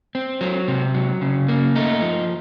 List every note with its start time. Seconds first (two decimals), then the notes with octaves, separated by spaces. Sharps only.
0.15 C4
0.41 F#3
0.68 C3
0.94 F#3
1.21 C#3
1.49 A#3
1.76 A3 D#4
2.02 F3